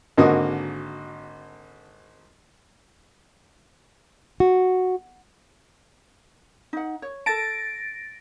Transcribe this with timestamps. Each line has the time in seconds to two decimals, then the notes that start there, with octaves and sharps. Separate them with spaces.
0.17 G#1 D3 A#3 F#4 D#5 D#6
4.40 F#4
6.73 D#4 F#5
7.02 C#5
7.26 A4 A5 A6 A#6 D7